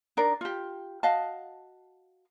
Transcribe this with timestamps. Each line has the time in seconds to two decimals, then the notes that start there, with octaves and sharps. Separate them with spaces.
0.17 D4 D#4 A#4 D5
0.41 F4 G4
1.03 F#4 D#5 F5 A5